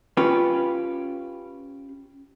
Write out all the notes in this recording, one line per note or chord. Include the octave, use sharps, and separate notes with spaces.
C#4 F4 G4 B4